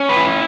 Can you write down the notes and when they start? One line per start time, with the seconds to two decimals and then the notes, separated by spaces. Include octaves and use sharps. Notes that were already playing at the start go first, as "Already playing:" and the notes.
Already playing: C#4
0.09 B4
0.17 E4